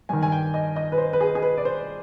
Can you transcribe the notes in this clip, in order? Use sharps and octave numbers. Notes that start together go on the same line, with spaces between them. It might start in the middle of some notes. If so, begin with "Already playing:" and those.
G2 D#3 G#5
G#5
G5
D#5
D#5
B4
C5
B4
G#4
G#4
B4
D5
C5